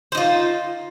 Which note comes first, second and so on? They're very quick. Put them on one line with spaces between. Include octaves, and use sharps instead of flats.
C5 D#4 F4